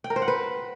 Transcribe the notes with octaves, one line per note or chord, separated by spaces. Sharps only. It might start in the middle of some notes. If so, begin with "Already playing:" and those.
G5
A#4
C5
F#5
B4